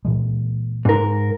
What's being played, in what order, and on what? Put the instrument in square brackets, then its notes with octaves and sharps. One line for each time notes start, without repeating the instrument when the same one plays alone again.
[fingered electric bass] A#2 E3 G#3
[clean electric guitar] G#2 A#4